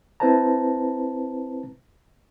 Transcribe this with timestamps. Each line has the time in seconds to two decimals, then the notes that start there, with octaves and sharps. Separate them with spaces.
0.20 C4 E4 B4 C5 A5 A#5